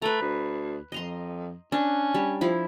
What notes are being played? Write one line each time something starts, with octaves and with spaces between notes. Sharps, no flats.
A3 B4 A#5
D2
F2 D#5 A#5 C6
C#4 D4
G3
F3 E4